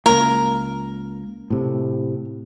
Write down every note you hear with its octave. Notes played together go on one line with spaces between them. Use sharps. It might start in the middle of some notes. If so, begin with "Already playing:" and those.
C#2 A#3 A#4
A2 C3